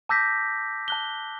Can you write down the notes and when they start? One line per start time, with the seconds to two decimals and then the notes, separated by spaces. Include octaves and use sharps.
0.09 A5 D6 E6 G6 A#6 B6
0.88 A5 F#6 G7